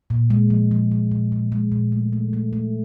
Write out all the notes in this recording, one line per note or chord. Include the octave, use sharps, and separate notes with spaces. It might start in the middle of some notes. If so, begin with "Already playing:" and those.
A#2
G#3
F3
F3
F3
A#2
A#2
G#3
A#2
A3
A3
A3
A3